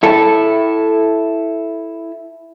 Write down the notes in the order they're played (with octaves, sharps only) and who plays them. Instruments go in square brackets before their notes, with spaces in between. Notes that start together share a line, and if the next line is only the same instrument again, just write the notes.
[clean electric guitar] E4 A4